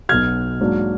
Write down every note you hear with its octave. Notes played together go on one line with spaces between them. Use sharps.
B1 B2 F#3 F6 G#6
G#2 F#3 A#3 D4